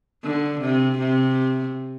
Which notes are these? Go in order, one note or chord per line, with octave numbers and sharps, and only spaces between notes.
D3
C3
C3